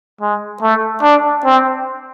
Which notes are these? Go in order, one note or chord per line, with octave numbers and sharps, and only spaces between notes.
G#3
A3
D4
C4